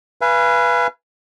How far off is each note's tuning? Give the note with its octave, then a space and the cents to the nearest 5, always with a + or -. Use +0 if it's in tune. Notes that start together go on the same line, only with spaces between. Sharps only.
B4 -10 F5 -40 G#5 +0